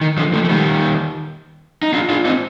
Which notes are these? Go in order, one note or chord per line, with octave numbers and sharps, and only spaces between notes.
D#3
D3 F3
F3 A3
A3
D#3 G3
D#4
D4 F4
D4 F4
C4 D#4